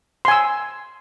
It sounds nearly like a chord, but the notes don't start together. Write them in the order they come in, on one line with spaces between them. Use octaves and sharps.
C6 G#5 E6